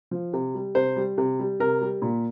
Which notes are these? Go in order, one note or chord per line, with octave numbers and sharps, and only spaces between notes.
F3
C3
G3
C3 C5
G3
C3
G3
C3 A#4
G3
A#2